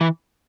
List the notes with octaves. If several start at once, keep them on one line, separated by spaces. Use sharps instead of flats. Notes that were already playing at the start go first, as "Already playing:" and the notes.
E3